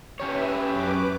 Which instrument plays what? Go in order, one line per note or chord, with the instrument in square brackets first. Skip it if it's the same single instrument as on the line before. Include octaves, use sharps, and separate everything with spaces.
[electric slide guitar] C#4 G4 C#5 [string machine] B4 E5
[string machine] F#2 B4 D6